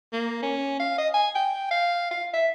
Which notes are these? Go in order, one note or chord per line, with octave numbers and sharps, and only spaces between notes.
A#3
C#4
F5
D#5
G#5
G5
F5
F5
E5